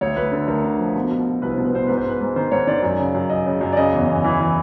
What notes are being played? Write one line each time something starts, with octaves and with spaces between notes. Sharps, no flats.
D2 C#5
D2 B4
D3 A4
D2 A#4
D3
F3
B2
B2
B2
C2 B4
B2 C5
B4
B2 C5
G#2 B4
C5
G#2 B4
G#2
D#3 C5
G#2 C#5
D#3 D5
F#2
C#3
F#2
F#2 D#5
C#3
F#2
D5
C#3 D#5
E2
E2
E3
E3